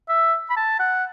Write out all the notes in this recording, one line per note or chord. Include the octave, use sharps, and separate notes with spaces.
E5
B5
A5
F#5